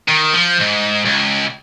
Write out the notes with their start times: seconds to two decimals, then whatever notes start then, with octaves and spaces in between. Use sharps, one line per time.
0.08 D#3
0.33 F3
0.60 G#2
1.06 C#2